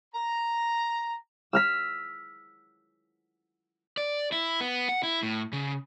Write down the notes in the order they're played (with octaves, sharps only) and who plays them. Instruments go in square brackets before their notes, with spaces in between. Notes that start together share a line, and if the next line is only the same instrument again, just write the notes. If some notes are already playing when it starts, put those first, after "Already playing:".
[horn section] A#5
[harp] E6 F6 B6
[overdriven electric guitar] D5
E4
B3
F#5
E4
A2
C#3